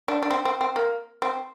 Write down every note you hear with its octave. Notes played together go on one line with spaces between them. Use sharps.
D4
D4
C4
C4
C4
A#3
C4